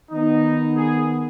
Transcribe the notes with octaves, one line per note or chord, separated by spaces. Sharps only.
D#3 B3 D#4
G#4